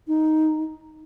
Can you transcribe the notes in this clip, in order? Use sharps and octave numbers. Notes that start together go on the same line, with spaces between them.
D#4